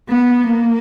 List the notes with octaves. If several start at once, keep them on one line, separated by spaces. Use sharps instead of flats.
B3
A#3